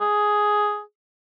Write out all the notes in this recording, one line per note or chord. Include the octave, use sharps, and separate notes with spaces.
G#4